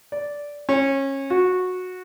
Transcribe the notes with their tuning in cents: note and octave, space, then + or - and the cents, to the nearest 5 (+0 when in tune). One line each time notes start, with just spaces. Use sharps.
D5 -10
C#4 -25
F#4 -15